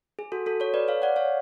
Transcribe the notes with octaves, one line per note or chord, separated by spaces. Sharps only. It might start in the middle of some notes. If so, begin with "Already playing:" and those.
G#4
F#4 A4
F#4 A4
A4 C#5
B4 D5
C#5 F5
D5 F#5
C#5 F5